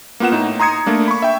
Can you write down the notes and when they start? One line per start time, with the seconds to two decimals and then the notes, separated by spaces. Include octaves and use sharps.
0.20 A#3 B3 F4 F#5 E7
0.32 A2 D#4
0.60 A#5 C6 D#6 G#6 C#7
0.86 A3 A#3 D4
1.08 B5 C#6
1.22 E5 G5